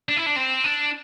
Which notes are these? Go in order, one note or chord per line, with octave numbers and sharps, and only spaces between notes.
D4
E4
D4
C4
D4